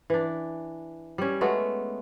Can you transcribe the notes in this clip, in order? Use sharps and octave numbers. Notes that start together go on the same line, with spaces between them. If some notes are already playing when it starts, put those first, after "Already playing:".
E3 D4
G3 C#4
G#3 A3 B3 F#4